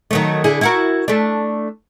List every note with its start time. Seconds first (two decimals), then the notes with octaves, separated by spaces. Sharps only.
0.11 D#3 F#3 A3
0.44 D3 E4 G#4
0.61 E4 F#4 A#4
1.08 A3 D4